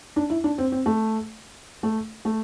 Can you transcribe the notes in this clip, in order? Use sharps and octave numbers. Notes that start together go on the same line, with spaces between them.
D4
E4
D4
C4
C4
A3
A3
A3